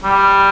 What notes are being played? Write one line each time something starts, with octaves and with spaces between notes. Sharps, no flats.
G3